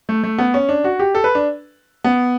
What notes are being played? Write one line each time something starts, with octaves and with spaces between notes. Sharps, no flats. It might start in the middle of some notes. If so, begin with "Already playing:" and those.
A3
A3
B3
C#4
D4
F#4
G4
A4
B4
D4
B3